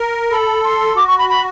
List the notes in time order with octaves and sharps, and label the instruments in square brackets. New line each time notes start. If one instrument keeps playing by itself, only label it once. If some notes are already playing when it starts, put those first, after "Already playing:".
Already playing: [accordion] A#4
[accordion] A4 [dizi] B5
[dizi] C6
[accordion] F#4 [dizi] D6
[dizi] C#6
B5
B5